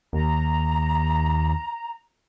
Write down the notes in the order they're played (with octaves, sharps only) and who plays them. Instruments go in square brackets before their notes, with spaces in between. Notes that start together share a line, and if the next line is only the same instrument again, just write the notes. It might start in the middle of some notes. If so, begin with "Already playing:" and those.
[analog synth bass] D#2 [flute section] A#5